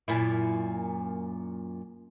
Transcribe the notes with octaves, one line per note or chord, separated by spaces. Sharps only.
F#2 A#2 E4